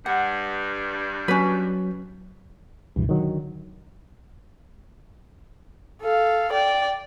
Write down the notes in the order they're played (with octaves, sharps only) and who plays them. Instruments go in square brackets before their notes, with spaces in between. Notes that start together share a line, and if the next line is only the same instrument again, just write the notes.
[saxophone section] G2 [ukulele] F#5
[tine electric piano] F#3 [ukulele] C#4 B4
[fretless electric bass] C#2 B2 E3 [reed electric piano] G2
[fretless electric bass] D3 [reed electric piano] D#3 F#3
[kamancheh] A4 F5
D5 G5